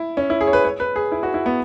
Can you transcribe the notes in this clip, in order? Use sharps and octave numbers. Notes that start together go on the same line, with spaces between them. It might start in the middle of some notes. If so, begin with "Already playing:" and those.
Already playing: E4
C#4
E4
G#4
C#5
B4
C#5
B4
G#4
E4
F#4
E4
B3